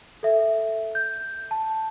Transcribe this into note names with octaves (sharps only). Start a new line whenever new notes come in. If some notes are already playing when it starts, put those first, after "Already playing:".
A4 E5
G6
A5